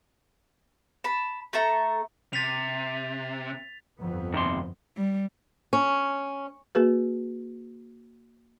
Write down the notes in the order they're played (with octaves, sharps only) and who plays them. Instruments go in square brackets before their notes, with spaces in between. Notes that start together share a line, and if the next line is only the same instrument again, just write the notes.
[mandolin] A5 B5
A3 A4 E5 A#5
[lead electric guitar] C3 [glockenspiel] A6 B6 F7
[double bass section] G1 F2 B3
[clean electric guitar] D#2 C3 C6
[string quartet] G3
[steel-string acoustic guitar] C#4
[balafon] A#3 F#4 G#4 B4